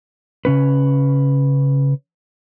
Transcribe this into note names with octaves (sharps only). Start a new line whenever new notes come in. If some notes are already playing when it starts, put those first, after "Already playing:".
C#3 C#4 B4